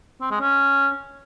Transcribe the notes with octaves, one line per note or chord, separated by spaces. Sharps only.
C4
G#3
C#4